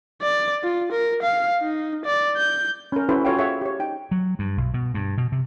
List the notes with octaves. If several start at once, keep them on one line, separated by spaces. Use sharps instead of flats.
D5
F4
A#4
F5
D#4
D5
G6
C#4 A#4
C#4 E4 F#4 A4 B4 C5
F4 F#4 A4 C#5 F5 G5
F#4 G#4 C#5 E5 F#5
G4 C#5
D#4 G5
F#3
G2
B1
B2
G2
B2
C3